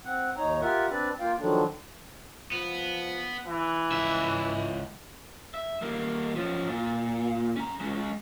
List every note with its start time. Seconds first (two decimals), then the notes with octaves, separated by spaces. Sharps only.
0.05 C4 F#5
0.37 D#2 D#4 C#5 A#5
0.61 F4 G4 A#4 E5 F#5
0.90 C4 D4 B4 D5
1.20 A#3 F4 F5 G5
1.39 D3 D#3 F3 F#3 D4
2.52 F3 B3
3.47 E3
3.91 C#2 E5
5.54 E5
5.82 G3 A#3
6.35 F3 C#4
6.68 A#2
7.56 C#4 A#5
7.80 G#3 C#4